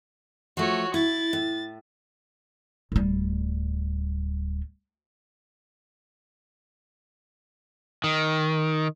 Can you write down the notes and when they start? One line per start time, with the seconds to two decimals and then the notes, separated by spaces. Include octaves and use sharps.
0.57 F3 A3 F#4 C#5
0.94 E4 A6
1.33 A2
2.92 D1 G3
8.04 D#3